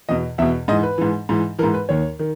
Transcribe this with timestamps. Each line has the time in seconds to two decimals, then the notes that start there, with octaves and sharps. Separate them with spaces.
0.09 E2 B2 D#5
0.38 E2 B2 E5
0.68 G#2 D#5
0.72 E3
0.83 B4
0.98 G#2 E3
1.29 G#2 E3
1.59 E3 A#4
1.63 G#2
1.74 B4
1.89 D#2 D#3 C#5
2.19 D#3